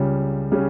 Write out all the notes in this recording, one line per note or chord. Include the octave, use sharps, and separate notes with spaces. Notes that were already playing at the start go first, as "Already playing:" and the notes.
Already playing: C#2 C#3 G3 C#4
C#3 G3 C#4